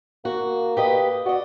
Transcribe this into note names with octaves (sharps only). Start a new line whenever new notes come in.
A#3 F#4
G4 B4 D#5
F#4 D5 D#5